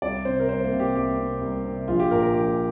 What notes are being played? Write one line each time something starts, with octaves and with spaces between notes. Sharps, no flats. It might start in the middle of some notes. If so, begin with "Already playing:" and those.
C2 D5
C3 C5
A#4
C2 C5
A#3
C3
G4
C2 G4
C3
C2
C3
A#1 F4
G4
A#2 A#4
A#4
A#1 G4